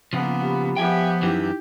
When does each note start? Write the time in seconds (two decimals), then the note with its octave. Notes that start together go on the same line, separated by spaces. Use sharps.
0.13 C#3 F3 A#3 B3
0.42 G4 B5
0.76 F3 B3 G4 E5 G5 G#5
1.22 F#2 E3 D#4 E4 G4